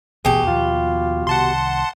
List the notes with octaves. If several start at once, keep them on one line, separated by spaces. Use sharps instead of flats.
E1 A1 D2 B2 G4 G#4
D#2 F3 B3 F4
C2 D#3 F#5 A5 C6